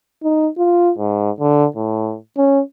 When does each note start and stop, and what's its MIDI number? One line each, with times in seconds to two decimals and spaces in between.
0.23 0.48 63
0.58 0.92 65
0.98 1.31 44
1.39 1.66 50
1.76 2.16 45
2.37 2.61 61